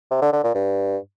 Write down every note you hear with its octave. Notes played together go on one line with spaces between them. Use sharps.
C3
D3
D3
A#2
G2